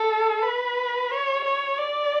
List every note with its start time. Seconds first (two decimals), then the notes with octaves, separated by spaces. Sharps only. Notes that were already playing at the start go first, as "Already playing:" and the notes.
Already playing: A4
0.42 B4
1.11 C#5
1.44 C#5
1.78 D5